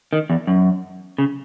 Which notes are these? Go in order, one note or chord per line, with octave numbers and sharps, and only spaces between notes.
D#3
E2
F#2
C#3